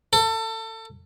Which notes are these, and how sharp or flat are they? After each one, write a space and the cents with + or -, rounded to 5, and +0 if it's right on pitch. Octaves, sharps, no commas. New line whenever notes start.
A4 +30